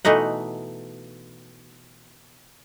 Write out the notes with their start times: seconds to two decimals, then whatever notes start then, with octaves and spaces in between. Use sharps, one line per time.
0.05 B2 E3 A3 D#4 F#5